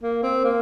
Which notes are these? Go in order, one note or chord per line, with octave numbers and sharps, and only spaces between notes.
A#3
C4
A#3